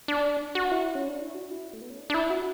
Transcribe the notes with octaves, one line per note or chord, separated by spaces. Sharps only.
D4
F#4
E4
C#4
D4
E4
F#4
E4
A3
B3
C#4
D4
D4
E4
F#4